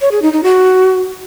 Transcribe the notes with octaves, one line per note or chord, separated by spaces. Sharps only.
C#5
G#4
D#4
D#4
F#4